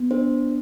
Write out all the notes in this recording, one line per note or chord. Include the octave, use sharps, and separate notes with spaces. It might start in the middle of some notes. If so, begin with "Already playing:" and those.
Already playing: B3
D4 C5